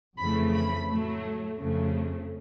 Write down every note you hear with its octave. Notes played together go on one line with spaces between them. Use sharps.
F2 C#3 E3 A3 B5
B5
A2 F#3 A3
F2 C#3 F#3 A3